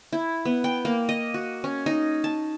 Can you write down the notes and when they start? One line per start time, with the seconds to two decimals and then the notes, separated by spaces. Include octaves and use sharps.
0.13 E4
0.45 B3
0.64 G5
0.85 A#3
1.09 D#5
1.34 F#4
1.64 C#4
1.86 D#4
2.24 A5